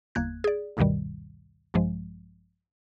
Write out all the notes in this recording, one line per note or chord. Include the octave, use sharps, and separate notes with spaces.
G1 E2 A#3 F#6 G#6
G#4 D5
A1 D2 G2 B2 D#3 G3
A#1 G2 F3 G#3